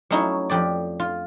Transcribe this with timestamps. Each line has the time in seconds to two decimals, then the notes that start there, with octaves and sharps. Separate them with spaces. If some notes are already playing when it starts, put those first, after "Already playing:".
0.10 F#3 A3 C#4 D#4 E4
0.50 F2 G4 D5
1.00 F4